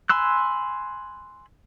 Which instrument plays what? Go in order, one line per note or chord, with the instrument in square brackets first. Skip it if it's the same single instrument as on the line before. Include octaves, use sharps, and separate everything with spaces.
[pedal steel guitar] G#5 B5 C6 E6 F#6